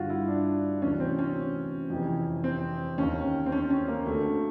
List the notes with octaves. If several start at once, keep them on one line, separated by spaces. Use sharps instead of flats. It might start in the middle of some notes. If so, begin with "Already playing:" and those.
Already playing: G2 D3 F4 F#4
E4
D4
D2 C3 E3 C#4
C4
C#4
F2 C3 E3
C4
D#2 D#3 C#4
C4
C#4
C#4
A#3
D2 D3 A3